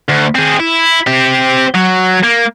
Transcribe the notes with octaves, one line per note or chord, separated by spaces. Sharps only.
D2
C4 G#4
E4
C4 G4
F#3
A#3